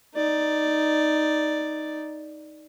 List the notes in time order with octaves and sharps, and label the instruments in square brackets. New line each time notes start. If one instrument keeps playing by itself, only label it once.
[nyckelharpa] D#4 D5